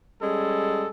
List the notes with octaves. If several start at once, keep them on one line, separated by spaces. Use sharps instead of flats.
G3 G#3 C#4 A4